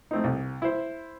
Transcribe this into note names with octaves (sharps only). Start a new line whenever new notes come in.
A3 C4 D#4
C2
E4 C5